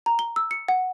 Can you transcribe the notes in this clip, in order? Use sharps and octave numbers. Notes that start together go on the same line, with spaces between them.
A#5
G7
E6
C#7
F#5